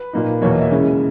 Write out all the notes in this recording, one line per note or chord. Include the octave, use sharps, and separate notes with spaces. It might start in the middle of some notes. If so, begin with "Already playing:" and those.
Already playing: B4
A#2 A#3 D#4
E2 B2 A#3 C#5
D#5
E5
C#3 E3 G#3 C#4